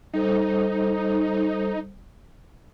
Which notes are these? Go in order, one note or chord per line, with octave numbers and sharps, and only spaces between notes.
G3 D#4 A4 C5